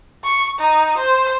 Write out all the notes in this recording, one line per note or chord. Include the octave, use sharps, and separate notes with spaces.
C#6
D#4
C5